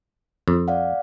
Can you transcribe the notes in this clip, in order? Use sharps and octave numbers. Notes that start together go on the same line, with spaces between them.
F2
D5 F5 F#5